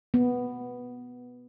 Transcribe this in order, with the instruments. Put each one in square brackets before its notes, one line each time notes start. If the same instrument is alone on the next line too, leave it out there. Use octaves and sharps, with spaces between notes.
[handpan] B3